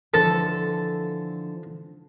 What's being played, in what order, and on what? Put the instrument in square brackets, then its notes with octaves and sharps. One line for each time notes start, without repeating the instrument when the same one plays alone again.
[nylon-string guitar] D3 E3 F3 [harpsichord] A4